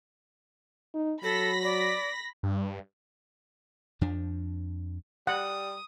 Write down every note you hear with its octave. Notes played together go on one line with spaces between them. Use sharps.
D#4
F#3 A4 B5 A#6 B6
D5
G2
F2 F3 D4
G3 F#5 D#6